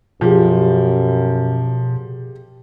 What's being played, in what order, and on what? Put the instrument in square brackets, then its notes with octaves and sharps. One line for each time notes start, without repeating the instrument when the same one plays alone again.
[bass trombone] F#2 [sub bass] B2 [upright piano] F3 [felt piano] G4 G#4